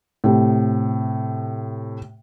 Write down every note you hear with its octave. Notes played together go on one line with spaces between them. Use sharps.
A2 C3